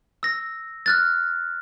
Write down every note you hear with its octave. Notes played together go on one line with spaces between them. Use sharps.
E6 A#6
F6 F#6 A6